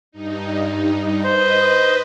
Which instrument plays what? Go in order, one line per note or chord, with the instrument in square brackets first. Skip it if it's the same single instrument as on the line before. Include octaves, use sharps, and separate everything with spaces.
[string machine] G2 D#4
[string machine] B4 D#5 [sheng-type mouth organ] C5